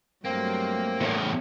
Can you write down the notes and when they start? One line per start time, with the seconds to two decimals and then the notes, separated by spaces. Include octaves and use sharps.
0.25 G2 F#3 A3 A#3 C4
1.01 E2 A2 C#4